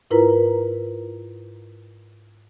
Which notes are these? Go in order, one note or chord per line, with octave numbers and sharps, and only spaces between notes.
G#2 E4 F4 A#4 B4 A#5